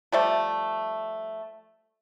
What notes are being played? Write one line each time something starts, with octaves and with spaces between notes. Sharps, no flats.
F3 G3 A3